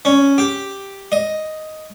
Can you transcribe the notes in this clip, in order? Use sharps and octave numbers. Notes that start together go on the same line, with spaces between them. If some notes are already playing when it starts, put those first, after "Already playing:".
C#4
G4
D#5